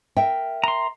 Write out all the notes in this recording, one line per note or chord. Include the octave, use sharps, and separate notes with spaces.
A#4 E5 G5
A#5 C6